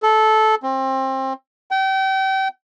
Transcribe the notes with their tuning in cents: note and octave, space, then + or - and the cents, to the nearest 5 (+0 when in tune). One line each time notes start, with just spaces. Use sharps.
A4 -15
C4 +25
G5 -35